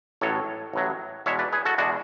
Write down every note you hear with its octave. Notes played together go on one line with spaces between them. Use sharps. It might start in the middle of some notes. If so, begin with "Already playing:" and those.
A1 A2 F#3 A4 C#5
A1 A2 F#3
E2 B2 G#3 C#5 E5
B4 D5
G#4 B4
F#4 A4
E2 B2 G#3 D4 F#4